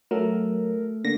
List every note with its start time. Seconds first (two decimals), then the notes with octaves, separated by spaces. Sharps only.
0.11 F#3 A3 A4 A#4
1.04 D3 A#3 A#6